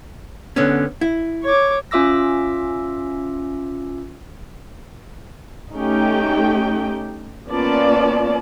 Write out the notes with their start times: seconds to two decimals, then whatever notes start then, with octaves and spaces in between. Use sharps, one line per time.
0.56 D3 B3 C#4
1.01 E4
1.44 C#5 D6
1.91 C#4 F4 E5 D6 E6 A#6
5.74 A3 C#4 D#4 G4 G5
7.48 A#3 B3 C#4 F4 D5 A5